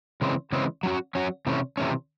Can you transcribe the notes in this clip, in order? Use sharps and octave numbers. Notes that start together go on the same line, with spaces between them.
C#3 E3 G#3 C4
C#3 E3 G#3 C4
F#3 C#4 F#4
F#3 C#4 F#4
C3 E3 A3 C#4
C3 E3 A3 C#4